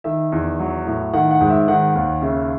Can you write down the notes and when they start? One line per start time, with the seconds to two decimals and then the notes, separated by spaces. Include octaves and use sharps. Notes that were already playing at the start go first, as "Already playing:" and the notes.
0.04 D#3 E5
0.32 E2
0.59 F#3
0.87 A2
1.13 D#3 F#5
1.31 F#5
1.41 G#2
1.50 E5
1.68 D#3 F#5
1.95 D#2
2.22 C#3 E5